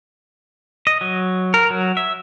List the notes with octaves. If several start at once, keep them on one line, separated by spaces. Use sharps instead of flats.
D#5
F#3
A#4
F#3
E5